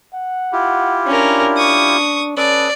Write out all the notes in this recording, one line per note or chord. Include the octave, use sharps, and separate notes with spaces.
F#5
E4 F4 G4
C#4 D4 A#4
C#6 D#6
C#4 A4 B4 D5 D#6